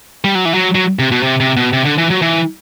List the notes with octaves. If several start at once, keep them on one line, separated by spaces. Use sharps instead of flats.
G3
F#3
E3
F#3
F#3
C3
B2
C3
C3
B2
C3
D3
E3
F#3
E3